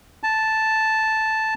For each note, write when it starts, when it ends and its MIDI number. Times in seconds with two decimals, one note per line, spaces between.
0.23 1.54 81